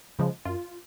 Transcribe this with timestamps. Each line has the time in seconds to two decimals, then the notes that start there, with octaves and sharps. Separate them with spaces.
0.19 C#3 F3 G#3
0.45 F#2 F4